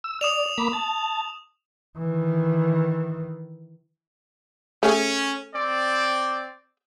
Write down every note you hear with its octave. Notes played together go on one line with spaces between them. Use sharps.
E6
D5 D#6 E7 F7
A#3 B5 D6
A5
D#3 E3
A3 C#4 G#4
C4 D5